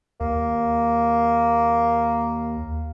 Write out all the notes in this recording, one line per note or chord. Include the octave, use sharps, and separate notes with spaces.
D#2 A#3